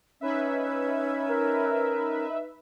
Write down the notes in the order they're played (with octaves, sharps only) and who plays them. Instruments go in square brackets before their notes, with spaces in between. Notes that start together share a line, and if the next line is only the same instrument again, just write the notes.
[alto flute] C#4 [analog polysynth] D#4 B4 E5
[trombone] A#4